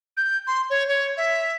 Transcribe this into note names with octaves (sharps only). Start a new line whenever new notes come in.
G6
C6
C#5
C#5
E5